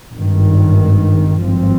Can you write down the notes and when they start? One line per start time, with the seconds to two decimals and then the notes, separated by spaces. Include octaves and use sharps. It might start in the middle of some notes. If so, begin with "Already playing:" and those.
0.12 G#1 G2 D#3
1.43 G#1 G2 F3 C4